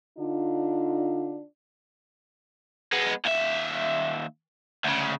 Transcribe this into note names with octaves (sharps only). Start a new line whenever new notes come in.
D3 D4 D#4 F4
G#3 B3
D#2 E5
D2 C#3